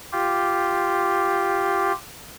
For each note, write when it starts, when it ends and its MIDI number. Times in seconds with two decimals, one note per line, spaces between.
0.12 1.92 65
0.12 1.92 67